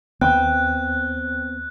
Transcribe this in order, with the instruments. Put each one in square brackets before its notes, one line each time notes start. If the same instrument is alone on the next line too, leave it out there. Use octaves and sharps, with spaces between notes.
[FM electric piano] D#2 [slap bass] B3 C4 [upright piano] G5 [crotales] F#6